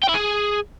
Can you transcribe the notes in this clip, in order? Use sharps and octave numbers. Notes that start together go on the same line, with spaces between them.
G5
E4
G#4